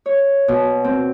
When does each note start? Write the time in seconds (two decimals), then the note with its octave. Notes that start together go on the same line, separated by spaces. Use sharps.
0.06 C#5
0.48 B2
0.84 C4